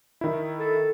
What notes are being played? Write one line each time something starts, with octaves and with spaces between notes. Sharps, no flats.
D#3 E4
A4